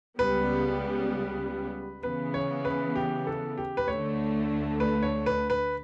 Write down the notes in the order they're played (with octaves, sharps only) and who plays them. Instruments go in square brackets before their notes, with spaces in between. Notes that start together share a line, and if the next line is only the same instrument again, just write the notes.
[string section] C#2 C#3 G3 B3 [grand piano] B4
[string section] C#3 E3 B3 [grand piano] B4
[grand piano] C#5
B4
G4
A4
G4
B4
[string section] D2 D3 A3 [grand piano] C#5
[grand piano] B4
C#5
B4
B4